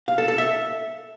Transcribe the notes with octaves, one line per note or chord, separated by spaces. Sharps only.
F5
A4
A4
E5